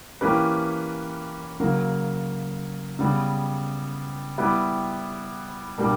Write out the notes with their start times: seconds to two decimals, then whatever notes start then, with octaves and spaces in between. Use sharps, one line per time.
0.21 E3 A#3 C#4 G4 B4
1.60 C#3 F#3 A#3
2.99 C#3 G3 B3
4.38 G3 B3 E4 G4 B4
5.78 B2 G3 A#3 D4 G4